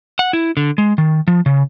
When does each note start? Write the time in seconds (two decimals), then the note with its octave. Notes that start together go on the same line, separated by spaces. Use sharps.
0.19 F#5
0.33 E4
0.57 D3
0.78 G#3
0.98 D#3
1.28 F3
1.46 C#3